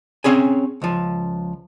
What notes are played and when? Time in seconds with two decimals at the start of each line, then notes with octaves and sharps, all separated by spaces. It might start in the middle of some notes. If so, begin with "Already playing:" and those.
0.24 C4 C#4 G#4 G#5
0.82 C#2 F3